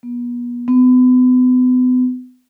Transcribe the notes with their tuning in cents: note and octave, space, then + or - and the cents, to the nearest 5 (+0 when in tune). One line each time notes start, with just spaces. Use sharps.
B3 -35
B3 +35